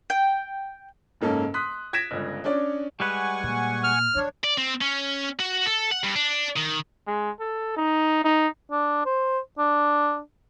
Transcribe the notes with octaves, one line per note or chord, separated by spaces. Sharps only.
G5
F#1 G#2 A#3 C#4 A4
C6 D#6 F#6 B6
G#6 A#6 B6 D7 E7
G1 C#2
C#4 D4 C#5 D5
G3 G#3 B4 F#5 G#5 C#6
A#2
F6
F3 D4 C#5
D5
C4
C#4
F#4
A4
F#5
G2
D4
D#3
G#3
A4
D#4
D#4
D4
C5
D4